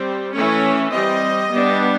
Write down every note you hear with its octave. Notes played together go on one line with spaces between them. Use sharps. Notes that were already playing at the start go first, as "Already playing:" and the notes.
Already playing: G3 C4
E3 A3 C#4 C#5
G3 C4 D#5
G3 B3 D4